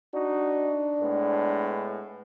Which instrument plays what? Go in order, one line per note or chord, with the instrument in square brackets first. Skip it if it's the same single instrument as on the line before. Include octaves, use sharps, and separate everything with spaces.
[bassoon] D4 [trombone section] D#4 F#4
[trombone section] A2 G#3 B3